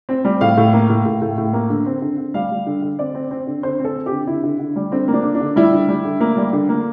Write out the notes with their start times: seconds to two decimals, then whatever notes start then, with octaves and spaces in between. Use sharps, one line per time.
0.09 C4
0.25 G3
0.41 A2 F5
0.57 A2
0.73 A#3
0.89 A2
1.05 A2
1.22 A2
1.38 A2
1.53 A#3
1.70 D3
1.86 C4
2.02 D3
2.18 D3
2.34 G3 F5
2.51 G3
2.67 D3
2.82 D3
2.99 C4 D5
3.15 C4
3.31 C4
3.47 D3
3.63 D3 C5
3.79 C4
3.84 A4
3.96 C4
4.06 G4
4.11 D3
4.27 D3 E4
4.44 D3
4.59 D3
4.76 G3
4.92 D3 C4
5.08 A#3
5.13 D4
5.24 D3
5.35 D4
5.41 D3
5.56 G3 E4
5.73 D3
5.88 G3
6.05 D3
6.21 A#3
6.37 G3
6.53 D3
6.69 A#3